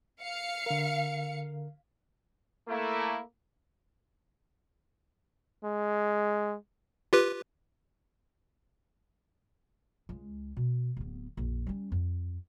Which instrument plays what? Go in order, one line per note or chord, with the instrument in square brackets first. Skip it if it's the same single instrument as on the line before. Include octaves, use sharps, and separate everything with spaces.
[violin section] F5 C#7
[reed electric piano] D3 A#4
[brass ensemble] A3 A#3 E4
[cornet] G#3
[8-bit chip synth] F4 G4 B4
[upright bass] C#2 G#3
B2
D1 B3
A#1 F2
G3 C#4
F2